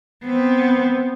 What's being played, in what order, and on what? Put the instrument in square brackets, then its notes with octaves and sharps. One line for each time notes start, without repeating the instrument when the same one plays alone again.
[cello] B3 C4